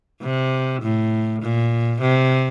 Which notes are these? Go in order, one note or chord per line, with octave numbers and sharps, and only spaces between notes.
C3
A2
A#2
C3